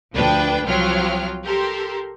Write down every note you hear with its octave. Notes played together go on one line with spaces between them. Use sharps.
D2 F3 D4 B4 G5
C2 F3 F#3 F4 G5 F6
G4 A4 A#4 C6